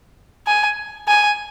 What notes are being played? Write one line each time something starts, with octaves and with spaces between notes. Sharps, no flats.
G#5
G#5